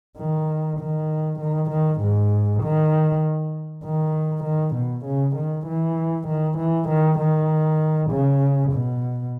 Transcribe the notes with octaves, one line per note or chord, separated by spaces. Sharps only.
D#3
D#3
D#3
D#3
G#2
D#3
D#3
D#3
B2
C#3
D#3
E3
D#3
E3
D#3
D#3
C#3
B2